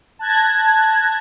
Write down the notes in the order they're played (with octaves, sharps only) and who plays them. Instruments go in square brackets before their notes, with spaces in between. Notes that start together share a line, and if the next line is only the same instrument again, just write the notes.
[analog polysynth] A5 F#6 G#6 A#6